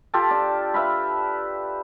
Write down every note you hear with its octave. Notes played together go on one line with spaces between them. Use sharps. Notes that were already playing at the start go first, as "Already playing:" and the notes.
F4 G4 A4 A5
D4
B4 E5 F5 B5